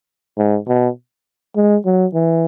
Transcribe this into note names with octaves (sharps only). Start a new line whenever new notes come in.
G#2
B2
G#3
F#3
E3